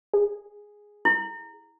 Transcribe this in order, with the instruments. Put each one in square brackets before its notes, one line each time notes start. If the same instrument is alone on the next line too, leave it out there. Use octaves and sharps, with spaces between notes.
[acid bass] G#4
[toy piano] E4